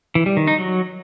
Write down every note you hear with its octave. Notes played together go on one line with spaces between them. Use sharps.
E3
G3
D#3
D#4
F#3